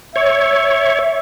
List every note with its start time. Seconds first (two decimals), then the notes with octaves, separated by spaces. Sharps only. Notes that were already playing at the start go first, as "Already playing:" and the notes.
0.16 C#5 E5